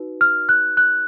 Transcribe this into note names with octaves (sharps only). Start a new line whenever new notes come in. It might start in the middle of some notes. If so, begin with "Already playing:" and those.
Already playing: D#4 F#4 B4
F6
F#6
F#6